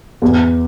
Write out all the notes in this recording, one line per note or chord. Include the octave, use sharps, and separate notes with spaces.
E2